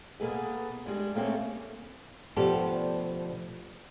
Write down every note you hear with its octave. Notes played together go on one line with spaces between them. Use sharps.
B2 A#3 B3 G#4 A4 B4
G3 G#3 D4
A3 A#3 C4 C#4 A4
D2 B2 F3 G4 A4 D5